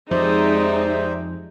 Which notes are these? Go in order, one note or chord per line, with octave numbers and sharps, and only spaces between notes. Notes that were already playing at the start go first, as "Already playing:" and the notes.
F2 C3 F3 G#3 D#4 C5 D5 E5